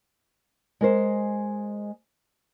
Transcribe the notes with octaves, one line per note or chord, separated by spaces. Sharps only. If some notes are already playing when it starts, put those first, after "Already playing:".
G#3 A#4 C5